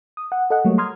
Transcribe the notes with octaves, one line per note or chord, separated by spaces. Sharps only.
D#6
F#5
A4 D#5 F#5
F#3 G3 A3 A#3 C#5
A#5 C6 D#6 F6 G#6